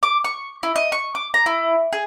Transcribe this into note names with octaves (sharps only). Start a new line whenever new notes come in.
D6
C#6
E4
D#5
C#6
D6
A#5
E4
G#4